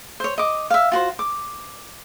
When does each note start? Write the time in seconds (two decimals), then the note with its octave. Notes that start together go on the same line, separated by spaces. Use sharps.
0.20 C5 C#5
0.38 D#5 D6
0.70 E5 F5
0.92 F4 F#4 C5
1.19 D6